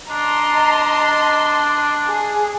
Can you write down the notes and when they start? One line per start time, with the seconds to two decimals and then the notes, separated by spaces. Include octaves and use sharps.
0.10 D4 D#5 A5 A#5 C6
2.08 G#4